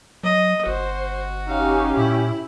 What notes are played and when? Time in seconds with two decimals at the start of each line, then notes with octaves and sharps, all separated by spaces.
0.23 F#3 D#5
0.66 G1 F#4 C5
1.47 C#4 D#4 G4 F5
1.97 A#2 E4